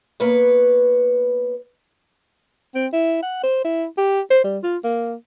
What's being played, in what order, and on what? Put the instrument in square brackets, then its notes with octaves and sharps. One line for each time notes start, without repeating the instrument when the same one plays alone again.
[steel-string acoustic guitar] A#3 B3 B4 C#5
[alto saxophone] C4
E4
F#5
C5
E4
G4
C5
G3
F4
A#3